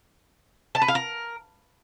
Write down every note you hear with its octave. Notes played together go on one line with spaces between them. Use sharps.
A5
B4
F5
A#4